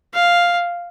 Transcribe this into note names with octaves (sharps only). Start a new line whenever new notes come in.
F5